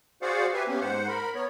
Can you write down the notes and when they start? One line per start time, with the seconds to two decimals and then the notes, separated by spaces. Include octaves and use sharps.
0.22 F#4 G#4 C5 D5 F5 F#5
0.54 G4 B4 E5 G#5
0.68 A#3 B3 C#4 G4
0.80 G#2 C5 F#5
1.08 A#4 B5
1.35 B3 C#5